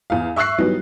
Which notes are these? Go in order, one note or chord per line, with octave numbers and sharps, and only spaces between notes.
E2 F5
E5 C#6 E6 F#6 C7
E3 F#3 G3 B3 D#4